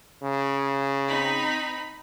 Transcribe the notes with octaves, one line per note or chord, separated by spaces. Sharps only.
C#3
C4 D#4 B5